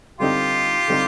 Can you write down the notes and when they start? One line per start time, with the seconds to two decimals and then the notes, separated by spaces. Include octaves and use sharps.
0.19 D3 G3 C4 D#4 F4 G4
0.88 D3 G3 C4 D#4